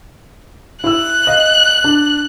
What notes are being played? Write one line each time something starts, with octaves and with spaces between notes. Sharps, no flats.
E4 E6 F#6
D#5 F5
D4